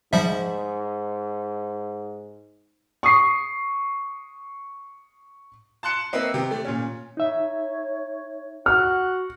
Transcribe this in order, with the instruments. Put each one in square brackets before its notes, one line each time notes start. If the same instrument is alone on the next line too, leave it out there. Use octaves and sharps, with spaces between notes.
[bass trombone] G#2 [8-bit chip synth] F3 G3 E5
[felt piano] C#6 D#6 C7
[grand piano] A5 C6 F#6 C#7 E7
A#3 C4 B4 D#5 E5
C3 G4
A3
A#2 C#4
[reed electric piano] D#4 E5 [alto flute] C#5
[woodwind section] F#4 F#5 [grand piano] F6